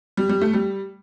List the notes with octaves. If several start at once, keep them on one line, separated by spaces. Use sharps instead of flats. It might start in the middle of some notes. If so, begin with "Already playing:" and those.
G3
G3
A3
G3